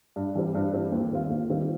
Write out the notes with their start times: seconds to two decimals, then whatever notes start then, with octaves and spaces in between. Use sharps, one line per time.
0.16 G2
0.35 E3 G3 C4
0.55 G2
0.74 E3 G3 C4
0.92 D#2
1.12 D#3 G3 C4 F4
1.30 D#2
1.50 D#3 G3 C4 F4